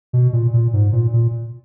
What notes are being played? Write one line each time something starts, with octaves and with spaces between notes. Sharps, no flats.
B2
A#2
A#2
G#2
A#2
A#2